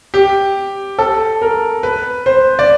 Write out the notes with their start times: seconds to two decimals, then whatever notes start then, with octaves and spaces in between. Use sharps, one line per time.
0.14 G4
0.98 A4
1.41 A#4
1.83 B4
2.26 C5
2.59 D5